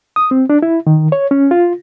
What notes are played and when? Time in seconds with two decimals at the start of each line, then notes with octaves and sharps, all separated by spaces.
0.16 D#6
0.31 C4
0.50 D4
0.62 E4
0.87 D#3
1.12 C#5
1.31 C#4
1.51 F4